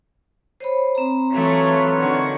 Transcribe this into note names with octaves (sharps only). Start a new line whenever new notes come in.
C5 C#5 B5
C4 A#5
E3 F#3 A3 F4 B4 C#5
D3 D#3 F#4